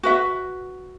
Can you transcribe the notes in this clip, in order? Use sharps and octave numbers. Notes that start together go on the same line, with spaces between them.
F#4 B4 E5